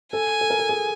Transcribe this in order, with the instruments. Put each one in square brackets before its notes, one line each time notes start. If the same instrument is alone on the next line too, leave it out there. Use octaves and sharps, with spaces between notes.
[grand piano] A4 [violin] G#5
[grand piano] A4
A#4
A4
G#4